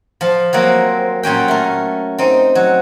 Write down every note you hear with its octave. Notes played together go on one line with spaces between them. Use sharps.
F3 A5
F#3 G3 A#3 C4
A#2 F#3 C#4 G5
A3 A#4
C4 D#4
F#3